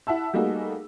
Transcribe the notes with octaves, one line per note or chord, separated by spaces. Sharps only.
E4 E5 F#5 A5 E6
G3 A3 A#3 D#4 F#4 G#4